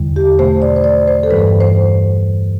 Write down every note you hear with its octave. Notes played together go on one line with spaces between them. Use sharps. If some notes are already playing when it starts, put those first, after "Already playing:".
Already playing: E2 D3 G3
G4
B2 A3 C5
D5
C5
D5
C5
A4
G2 E3 G3 B4
C5